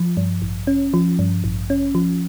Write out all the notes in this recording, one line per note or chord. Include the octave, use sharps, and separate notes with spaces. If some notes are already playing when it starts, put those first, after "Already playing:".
Already playing: F3
G2
A1
C#4
F3
G2
A1
C#4
F3